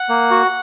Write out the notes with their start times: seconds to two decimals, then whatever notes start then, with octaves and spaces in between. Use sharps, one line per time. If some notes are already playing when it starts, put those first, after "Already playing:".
Already playing: F#5
0.09 A#3
0.31 F#4